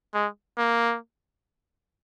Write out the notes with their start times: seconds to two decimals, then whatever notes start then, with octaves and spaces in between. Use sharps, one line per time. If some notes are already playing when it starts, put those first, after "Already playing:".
0.14 G#3
0.58 A#3